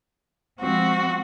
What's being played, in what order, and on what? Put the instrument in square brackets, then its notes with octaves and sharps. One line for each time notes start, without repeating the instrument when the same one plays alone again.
[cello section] F3 G#3 C4 [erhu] F#4